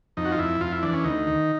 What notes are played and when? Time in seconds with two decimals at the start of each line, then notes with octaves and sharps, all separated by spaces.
0.17 F2 D#4
0.25 F#4
0.32 F4
0.39 F2 E4
0.61 F2 F4
0.72 E4
0.83 E3 D4
0.93 C#4
1.04 D2 D#4
1.27 D#3